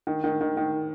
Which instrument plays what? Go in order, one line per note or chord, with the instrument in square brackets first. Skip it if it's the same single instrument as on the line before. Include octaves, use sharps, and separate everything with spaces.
[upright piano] D#3
D#3
D#3
D#3